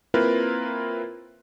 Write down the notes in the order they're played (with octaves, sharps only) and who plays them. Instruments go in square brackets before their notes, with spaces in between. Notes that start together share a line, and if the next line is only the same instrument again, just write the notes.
[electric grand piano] A#3 C4 E4 F4 A#4 B4